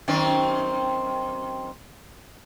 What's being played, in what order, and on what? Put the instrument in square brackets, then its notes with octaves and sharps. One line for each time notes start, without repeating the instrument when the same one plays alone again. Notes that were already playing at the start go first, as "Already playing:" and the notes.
[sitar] F#2 D#3 C4